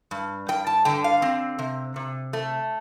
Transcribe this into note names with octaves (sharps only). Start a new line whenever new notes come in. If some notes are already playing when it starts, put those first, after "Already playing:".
G2
G2 G5
A5
D3 G5
F5
C4
C3
C3
A3